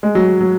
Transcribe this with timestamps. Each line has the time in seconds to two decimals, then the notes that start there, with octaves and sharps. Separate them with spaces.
0.03 G#3
0.15 F#3
0.41 F#3